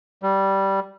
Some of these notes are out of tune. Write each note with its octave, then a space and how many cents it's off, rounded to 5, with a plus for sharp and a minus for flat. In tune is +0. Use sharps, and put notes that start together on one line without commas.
G3 -10